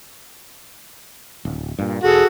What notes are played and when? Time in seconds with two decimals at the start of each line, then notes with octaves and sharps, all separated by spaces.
1.45 D1
1.79 G2 A#2
2.04 E1 F#4 G#4 A4 F#5